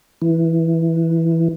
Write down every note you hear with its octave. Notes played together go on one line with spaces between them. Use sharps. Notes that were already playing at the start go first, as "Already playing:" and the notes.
E3